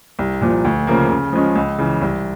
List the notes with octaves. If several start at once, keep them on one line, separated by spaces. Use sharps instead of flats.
C2
A#2 F3
D2
C#3 F3 A#3
C#3
F3 G#3 C#4
C#2
C#3 E3
C2